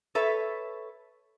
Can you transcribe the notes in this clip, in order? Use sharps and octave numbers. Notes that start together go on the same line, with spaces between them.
A4 B4 C#5 E5